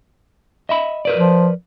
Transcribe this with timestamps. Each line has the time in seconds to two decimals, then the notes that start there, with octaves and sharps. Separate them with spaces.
0.69 D#5 E5 B5
1.05 A#4 B4 D5
1.18 F3